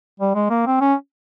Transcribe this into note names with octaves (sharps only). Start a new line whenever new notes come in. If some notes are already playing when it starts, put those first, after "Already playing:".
G3
G#3
A#3
C4
C#4